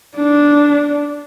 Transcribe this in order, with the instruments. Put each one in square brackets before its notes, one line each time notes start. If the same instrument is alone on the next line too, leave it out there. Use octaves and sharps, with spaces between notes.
[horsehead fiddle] D4